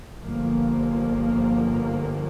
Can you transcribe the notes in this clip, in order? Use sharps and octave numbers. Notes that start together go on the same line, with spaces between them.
G1 G2 F3 A#3